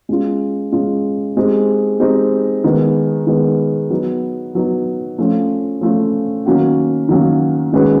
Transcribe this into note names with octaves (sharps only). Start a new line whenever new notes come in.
G#3 C#4 F4
G#3 C#4 F4
G#3 C4 D#4 G4
G#3 C4 D#4 G4
D#3 G#3 B3
D#3 G#3 B3
F#3 B3 D#4
F#3 B3 D#4
F3 A3 C#4 F4
F3 A3 C#4 F4
D#3 F#3 A#3 C#4 F#4
D#3 F#3 A#3 C#4 F#4
D#3 G#3 C#4 F#4 B4